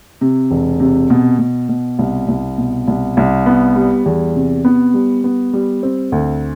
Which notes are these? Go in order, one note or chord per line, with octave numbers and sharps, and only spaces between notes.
C3
E1
C3
B2
B2
B2
C2
C2
B2
C2
C2
B3
G3
E2
C3
B3
G3
B3
G3
C4
D2